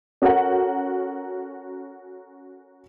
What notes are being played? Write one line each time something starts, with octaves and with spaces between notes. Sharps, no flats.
C#4 F#4 A4 A#4 F#5